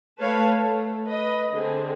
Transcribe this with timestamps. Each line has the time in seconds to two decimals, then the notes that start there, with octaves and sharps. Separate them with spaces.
0.21 A3 B4 C#5 F5 A5
0.58 A3
1.04 B4 D#5
1.53 D3 C4 G#4